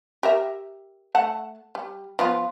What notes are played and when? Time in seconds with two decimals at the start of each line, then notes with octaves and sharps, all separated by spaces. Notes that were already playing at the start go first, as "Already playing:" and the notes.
0.23 G4 A#4 E5
1.15 A3 F#5 A5
1.75 G3
2.19 F3 B3 F4